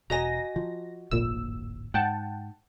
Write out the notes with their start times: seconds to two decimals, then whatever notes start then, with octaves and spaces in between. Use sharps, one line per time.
0.10 E1 F#4 D#5 G#5 A#5 A#6
0.56 F3
1.11 D1 G#1 F2 A#2 E6
1.94 G#2 F#5 G5 A5